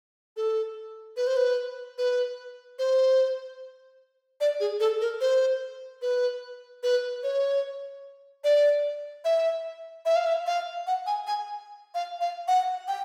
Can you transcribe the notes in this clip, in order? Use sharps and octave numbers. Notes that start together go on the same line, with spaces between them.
A4
B4
C5
B4
B4
C5
D5
G#4
A4
A#4
C5
B4
B4
C#5
D5
E5
E5
F5
E5
F5
F#5
G#5
G#5
F5
F5
F#5
G5